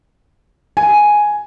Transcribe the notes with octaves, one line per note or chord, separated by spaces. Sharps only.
G#5